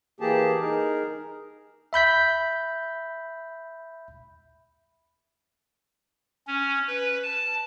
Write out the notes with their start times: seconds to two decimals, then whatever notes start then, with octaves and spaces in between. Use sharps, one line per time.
0.20 E3 A#3 G4 G#4 A5
0.60 D#4 G#4 A#4
1.93 E5 B5 G6 B6
6.47 C#4
6.87 B4
7.23 A5